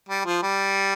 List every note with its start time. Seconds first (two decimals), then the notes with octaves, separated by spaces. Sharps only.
0.09 G3
0.25 F3
0.42 G3